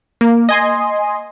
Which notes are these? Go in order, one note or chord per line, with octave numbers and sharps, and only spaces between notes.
A#3
D#5 G#5 C6